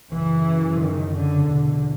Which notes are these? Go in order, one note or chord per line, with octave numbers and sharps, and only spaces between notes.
F#2 C#3 E3
D#3
D3
E2 B2